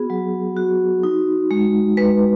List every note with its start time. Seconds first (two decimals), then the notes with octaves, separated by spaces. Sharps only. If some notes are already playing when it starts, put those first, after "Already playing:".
Already playing: B3 F#4 G#4
0.10 F#3
0.57 F#4
1.03 D#4
1.51 G#3
1.97 G#3 B4